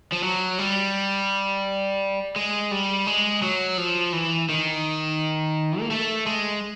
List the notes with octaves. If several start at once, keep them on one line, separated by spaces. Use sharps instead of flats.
F3
F#3
G3
G#3
G3
G#3
F#3
F3
E3
D#3
A#3
A3
G#3